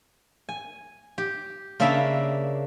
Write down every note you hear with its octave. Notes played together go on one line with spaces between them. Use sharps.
G#5
G4
C#3 A#3 D4 D5 E5 B5